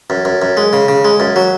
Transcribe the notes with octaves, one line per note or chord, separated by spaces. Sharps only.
F#2
F#2
F#2
G#3
C#3
C#3
G#3
F#2
F#3